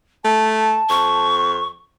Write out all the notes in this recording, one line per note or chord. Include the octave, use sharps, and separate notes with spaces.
A3 A5
F2 C#6